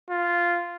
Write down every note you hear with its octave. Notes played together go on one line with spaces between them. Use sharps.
F4